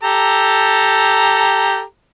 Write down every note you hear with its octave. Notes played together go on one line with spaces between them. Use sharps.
G4 A4 A#5